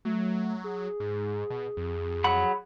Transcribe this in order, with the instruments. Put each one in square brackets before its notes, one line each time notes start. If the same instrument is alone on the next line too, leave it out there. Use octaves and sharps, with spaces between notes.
[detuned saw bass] F#3 [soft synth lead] A3
[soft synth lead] G#4
[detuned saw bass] G#2
B2
F2
[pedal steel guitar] F#3 F#5 B5